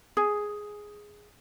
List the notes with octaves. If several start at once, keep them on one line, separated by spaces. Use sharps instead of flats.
G#4